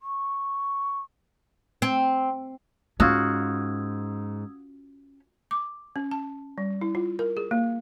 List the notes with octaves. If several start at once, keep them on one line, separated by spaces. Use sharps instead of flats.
C#6
C4
G#2 C#4 F4 F#4 D#6 E6 G#6
D6
C#4
A5
G3
E4
F4
A#4
G#4
A#3